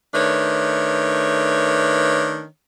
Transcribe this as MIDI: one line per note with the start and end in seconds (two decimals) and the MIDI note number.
0.14 2.45 51
0.14 2.45 57
0.14 2.45 62
0.14 2.45 71
0.14 2.45 73